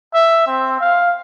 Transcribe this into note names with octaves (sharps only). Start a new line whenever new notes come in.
E5
C4
F5